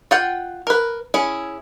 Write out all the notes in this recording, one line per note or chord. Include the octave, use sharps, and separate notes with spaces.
F4 F#5 G5
A#4 B4
C#4 E4 G#4